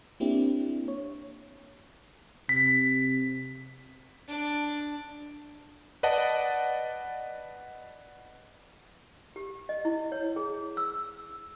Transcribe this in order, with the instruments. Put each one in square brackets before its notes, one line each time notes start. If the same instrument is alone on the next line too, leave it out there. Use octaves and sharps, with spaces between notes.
[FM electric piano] A#3 C4 D4 E4 G4
C#5
[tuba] C3 [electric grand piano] B6
[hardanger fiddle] D4 D6
[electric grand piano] B4 D5 D#5 F#5 A5
[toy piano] G4
D#5
E4
C#5
G#4
E6